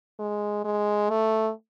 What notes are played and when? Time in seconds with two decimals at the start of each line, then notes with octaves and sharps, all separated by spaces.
0.19 G#3
0.64 G#3
1.10 A3